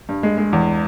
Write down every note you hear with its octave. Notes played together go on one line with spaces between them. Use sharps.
G2
G#3
G#3
E2